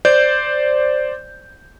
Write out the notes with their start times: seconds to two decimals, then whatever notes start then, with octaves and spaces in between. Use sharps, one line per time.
0.05 C5 D5 G6